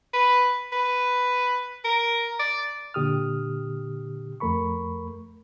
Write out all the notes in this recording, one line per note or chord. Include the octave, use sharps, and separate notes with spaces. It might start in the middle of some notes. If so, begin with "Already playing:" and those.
B4
B4
A#4
D5
A#2 D3 G4 D#6 F6
F2 A3 A#4 B5 C#6